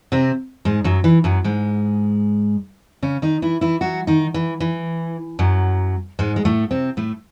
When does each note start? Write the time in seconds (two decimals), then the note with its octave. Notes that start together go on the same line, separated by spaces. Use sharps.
0.12 C3 C4
0.65 G#2 G#3
0.84 F#2 F#3
1.04 E3
1.24 F#2 F#3
1.44 G#2 G#3
3.02 C#3 C#4
3.22 D#3 D#4
3.42 E3 E4
3.61 E3 E4
3.81 F#3 F#4
4.07 D#3 D#4
4.34 E3
4.60 E3
5.39 F#2 F#3
6.19 G#2 G#3
6.36 G#3
6.45 A2 A3
6.71 C3 C4
6.97 A2 A3